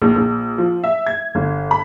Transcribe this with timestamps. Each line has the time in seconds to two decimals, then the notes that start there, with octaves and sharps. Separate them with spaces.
0.02 A#1
0.16 A#1
0.58 F3
0.84 E5
1.07 G#6
1.35 G1
1.71 B5